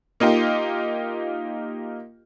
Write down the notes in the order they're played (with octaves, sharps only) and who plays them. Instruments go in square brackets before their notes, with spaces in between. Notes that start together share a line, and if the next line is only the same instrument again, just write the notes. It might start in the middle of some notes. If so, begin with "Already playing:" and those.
[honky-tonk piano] A#3 D#4 F4 G4